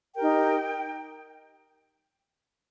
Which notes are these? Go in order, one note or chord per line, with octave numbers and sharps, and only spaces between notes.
D#4 G4 A#4 G5